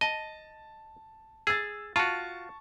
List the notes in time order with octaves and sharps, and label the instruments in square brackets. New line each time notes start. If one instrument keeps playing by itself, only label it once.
[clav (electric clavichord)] D#5 [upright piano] A5
[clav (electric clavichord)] G#4 [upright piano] E6 A6
[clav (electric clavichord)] F4 F#4 [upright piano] A5 C#6